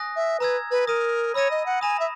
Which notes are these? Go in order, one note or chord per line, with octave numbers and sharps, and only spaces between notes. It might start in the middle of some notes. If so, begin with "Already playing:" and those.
Already playing: G#5 D#6 F#6 A#6
E5
B4 A#5 E6 G#6
B4
A#4 D#6 A#6 D#7
C#5 B5 E6 A#6 D#7
D#5
F#5
G#5 B5 D#6 A#6 E7
E5